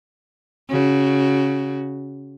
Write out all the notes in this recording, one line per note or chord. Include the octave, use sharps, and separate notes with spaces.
C#3 F#4